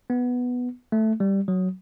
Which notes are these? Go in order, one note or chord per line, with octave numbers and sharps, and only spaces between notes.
B3
A3
G3
F#3